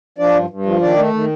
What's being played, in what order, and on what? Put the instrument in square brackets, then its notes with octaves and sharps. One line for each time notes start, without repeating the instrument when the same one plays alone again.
[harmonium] F3 D4 D5
G2
G2
F3
D#3 D4 D5
A3
D#3